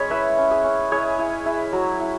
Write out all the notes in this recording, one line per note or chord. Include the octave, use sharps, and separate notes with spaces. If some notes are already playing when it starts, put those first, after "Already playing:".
Already playing: G#3 C#4 C#5 B5
E4 B4 E5
C#4
G#4
C#4
E4 G#4 C#5
E4
E4
F#3
E4